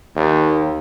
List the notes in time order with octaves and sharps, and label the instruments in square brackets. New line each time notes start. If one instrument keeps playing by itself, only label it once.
[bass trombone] D#2